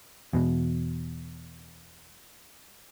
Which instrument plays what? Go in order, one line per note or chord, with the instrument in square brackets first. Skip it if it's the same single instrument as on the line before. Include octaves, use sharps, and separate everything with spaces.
[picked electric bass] E2 B2